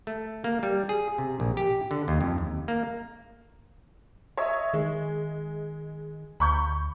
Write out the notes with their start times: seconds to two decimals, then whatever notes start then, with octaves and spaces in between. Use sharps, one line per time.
0.07 A3
0.44 A#3
0.63 G3
0.89 G#4
1.18 C3
1.40 A#1
1.57 G4
1.91 D3
2.08 D#2
2.21 F2
2.38 D#2
2.68 A#3
4.37 C#5 D#5 E5
4.74 D#3 G#3
6.40 D2 B5 C#6 G6